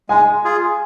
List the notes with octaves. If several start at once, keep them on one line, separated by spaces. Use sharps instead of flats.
G#3 G#5
F4 G#4